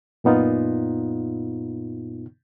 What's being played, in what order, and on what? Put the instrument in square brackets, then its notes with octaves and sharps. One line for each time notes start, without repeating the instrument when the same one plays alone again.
[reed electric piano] F#2 A#2 B3 D#4 F4